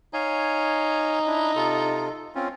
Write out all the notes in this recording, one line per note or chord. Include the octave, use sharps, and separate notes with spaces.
D#4 C#5 F5 G#5
D4 E4
C3 F4 A4
C4 C#4 F4